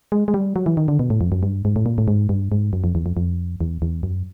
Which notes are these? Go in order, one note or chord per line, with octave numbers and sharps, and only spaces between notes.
G#3
G#3
G3
F#3
E3
D#3
D3
B2
A2
F2
F#2
G2
G#2
A2
A#2
A2
G#2
G2
G#2
F#2
F2
E2
F2
F2
E2
E2
F#2